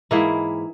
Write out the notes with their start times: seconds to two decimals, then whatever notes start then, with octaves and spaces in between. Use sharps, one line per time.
0.11 G#2 E3 A#3 E4 G#4